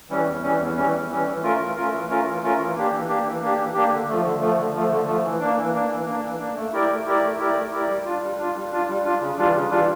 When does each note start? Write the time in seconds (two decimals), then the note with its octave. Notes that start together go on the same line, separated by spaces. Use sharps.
0.10 E3 G3 C#4
0.26 E2
0.43 E3 G3 C#4
0.60 E2
0.77 E3 G3 C#4
0.93 E2
1.09 E3 G3 C#4
1.26 E3
1.43 A3 C#4 F4 A#4
1.59 E3
1.75 A3 C#4 F4 A#4
1.92 E3
2.09 A3 C#4 F4 A#4
2.25 E3
2.42 A3 C#4 F4 A#4
2.59 E3
2.75 A#3 D4 G4
2.92 E3
3.08 A#3 D4 G4
3.25 E3
3.41 A#3 D4 G4
3.57 E3
3.74 A#3 D4 G4
3.91 D3
4.08 F3 A3
4.24 D3
4.41 F3 A3
4.57 D3
4.74 F3 A3
4.90 D3
5.07 F3 A3
5.23 E3
5.40 A#3 D4
5.57 E3
5.73 A#3 D4
5.90 E3
6.06 A#3 D4
6.22 E3
6.39 A#3 D4
6.56 A3
6.73 E4 G4 A#4 D5
6.89 A3
7.06 E4 G4 A#4 D5
7.22 A3
7.38 E4 G4 A#4 D5
7.55 A3
7.71 E4 G4 A#4 D5
7.88 G3
8.05 D4 F4
8.22 G3
8.38 D4 F4
8.55 G3
8.71 D4 F4
8.89 G3
9.05 D4 F4
9.21 C#3
9.38 E3 G3 D4 F4
9.54 C#3
9.71 E3 G3 D4 F4